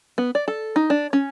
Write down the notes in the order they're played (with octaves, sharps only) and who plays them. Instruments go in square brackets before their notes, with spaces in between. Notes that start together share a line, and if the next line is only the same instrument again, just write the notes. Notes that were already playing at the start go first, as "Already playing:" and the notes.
[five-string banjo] B3
D5
A4
D#4
D4
C#4